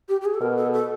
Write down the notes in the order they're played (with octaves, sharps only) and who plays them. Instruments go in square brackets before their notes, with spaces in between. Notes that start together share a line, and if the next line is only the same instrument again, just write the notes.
[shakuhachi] G4
G4
G#4
A4
[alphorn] B2 [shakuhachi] A#4
[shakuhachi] A4
A4